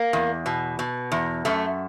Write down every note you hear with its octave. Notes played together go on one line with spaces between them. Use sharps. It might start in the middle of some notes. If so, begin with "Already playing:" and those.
Already playing: A#3
E2
B2
B2
E2
F#2 A3